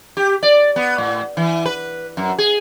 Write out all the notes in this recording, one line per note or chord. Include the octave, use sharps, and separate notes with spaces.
G4
D5
B3
A2
E3
B4
F#2
G#4